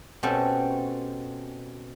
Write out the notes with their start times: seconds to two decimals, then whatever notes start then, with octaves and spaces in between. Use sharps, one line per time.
0.23 B2 C4 C#4 F#4 G4 A4